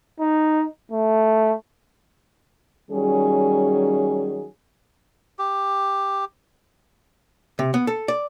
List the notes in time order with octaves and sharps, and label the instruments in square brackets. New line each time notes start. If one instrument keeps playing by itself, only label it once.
[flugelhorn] D#4
A3
[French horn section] D#3 F#3 G3 C#4 G#4
[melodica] G4
[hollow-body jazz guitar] C3
B3
A4
D5